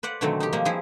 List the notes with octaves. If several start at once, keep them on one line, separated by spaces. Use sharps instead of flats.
B4 C5 D5 F#5
B2 D3 D#3 F#3 A3 C4
D#4 G4
F3 G3 A#3
F3 E4 G#4